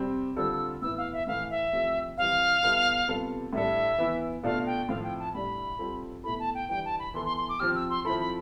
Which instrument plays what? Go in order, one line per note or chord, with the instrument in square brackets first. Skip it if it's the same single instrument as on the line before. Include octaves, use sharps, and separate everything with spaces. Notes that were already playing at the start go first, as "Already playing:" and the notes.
Already playing: [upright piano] C3 G3 C4
[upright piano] D3 G3 C4 F4 A4 [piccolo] E6
[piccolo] E6
[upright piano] A2 E3 B3 E4 [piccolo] E6
[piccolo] F5
E5
[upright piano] A2 E3 A3 E4 [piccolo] F5
[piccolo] E5
[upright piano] F3 A3 C4 G4
[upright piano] E3 G3 C4 [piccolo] F5
[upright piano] B2 G3 B3 E4 A4
C3 G3 B3 F4 A4
[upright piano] A2 G3 D4 A4 [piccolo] E5
[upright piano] E3 B3 E4
[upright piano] B2 A3 D4 F4 A4 [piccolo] F5
[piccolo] G5
[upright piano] A2 F3 C4 F4 [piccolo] F5
[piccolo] G5
A5
[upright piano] A2 G3 D4 [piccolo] B5
[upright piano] G3 C4 F4 A4
[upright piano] B2 A3 E4 A4 [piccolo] B5
[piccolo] A5
G5
[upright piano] E3 G3 D4 [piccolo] G5
[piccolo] A5
B5
[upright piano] E3 B3 E4 A4 [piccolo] C6
[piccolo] C6
C6
D6
[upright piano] F3 C4 G4 [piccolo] F6
[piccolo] E6
C6
[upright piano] F3 C4 E4 A4 [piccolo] B5
[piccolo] B5